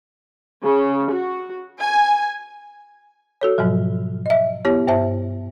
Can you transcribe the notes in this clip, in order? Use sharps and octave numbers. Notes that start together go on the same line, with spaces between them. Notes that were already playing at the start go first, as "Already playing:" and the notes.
C#3
F#4
G#5
F#4 A4 C#5
G#2 B2 F3 F#3
D#5 E5
B3 E4 G4 C#5
G2 C5 E5 A5